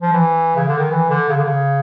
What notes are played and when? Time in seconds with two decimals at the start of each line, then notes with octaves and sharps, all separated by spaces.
0.02 F3
0.13 E3
0.56 C#3
0.68 D3
0.79 D#3
0.91 E3
1.10 D3
1.29 C#3
1.37 D3
1.45 C#3